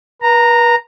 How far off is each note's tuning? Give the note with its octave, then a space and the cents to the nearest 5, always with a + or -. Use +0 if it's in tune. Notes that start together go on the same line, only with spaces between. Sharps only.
B4 -40 A#5 -10